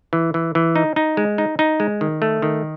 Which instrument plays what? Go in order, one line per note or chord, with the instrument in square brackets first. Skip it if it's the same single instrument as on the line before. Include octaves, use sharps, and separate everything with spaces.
[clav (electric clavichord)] E3
E3
E3
D#4
D#4
G#3
D#4
D#4
G#3
D#3
A3
D#3